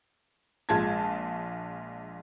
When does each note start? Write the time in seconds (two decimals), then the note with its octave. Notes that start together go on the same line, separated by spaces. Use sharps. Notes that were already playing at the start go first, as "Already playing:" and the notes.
0.69 A#1 G#3 F4 A5 G#6